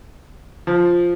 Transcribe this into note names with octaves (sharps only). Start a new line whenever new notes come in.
F3